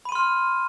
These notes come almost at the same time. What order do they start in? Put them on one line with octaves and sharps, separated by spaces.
B5 D#7 C6 F6